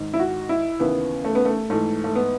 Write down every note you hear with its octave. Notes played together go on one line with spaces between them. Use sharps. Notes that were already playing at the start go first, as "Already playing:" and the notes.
Already playing: G#2 D#3
E4
F#4
E4
D#2 C#3 E3 B3
A3
B3
A3
G#2 E3 A3
A3
B3